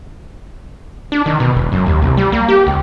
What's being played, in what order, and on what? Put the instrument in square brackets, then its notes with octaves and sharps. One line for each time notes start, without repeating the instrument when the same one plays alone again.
[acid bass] D4
D#3
B2
E1
F#2
D#2
C2
G3
A#3
G4
C#2